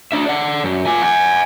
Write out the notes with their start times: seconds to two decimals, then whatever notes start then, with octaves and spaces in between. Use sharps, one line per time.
0.12 D4 E5
0.26 D5 F#5
0.64 F#2
0.86 F4 G#5
1.02 F#5 G#5